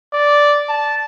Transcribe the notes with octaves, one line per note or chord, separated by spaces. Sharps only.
D5
A5